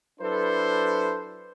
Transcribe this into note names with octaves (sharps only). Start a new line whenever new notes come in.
F#3 D4 E4 A4 B4 C5